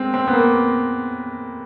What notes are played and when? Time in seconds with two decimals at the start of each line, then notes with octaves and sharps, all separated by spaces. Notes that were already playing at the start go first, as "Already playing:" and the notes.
Already playing: G#3 C4
0.14 C4
0.27 B3
0.33 A#3